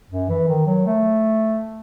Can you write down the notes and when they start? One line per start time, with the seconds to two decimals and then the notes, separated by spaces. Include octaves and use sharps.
0.10 F#2
0.29 E3
0.48 D#3
0.67 F#3
0.86 A3